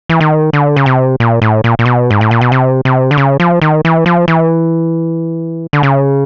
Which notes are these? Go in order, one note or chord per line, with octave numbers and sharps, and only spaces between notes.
E3
D#3
D3
C#3
C3
A#2
A2
A#2
A#2
B2
G#2
A2
A#2
B2
C3
C3
D3
C#3
F3
D#3
E3
F3
E3
D3
C#3